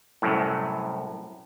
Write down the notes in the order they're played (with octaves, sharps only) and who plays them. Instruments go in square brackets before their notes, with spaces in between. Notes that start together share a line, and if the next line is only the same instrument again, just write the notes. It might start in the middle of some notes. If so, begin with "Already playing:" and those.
[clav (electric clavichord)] C2 F#2 A2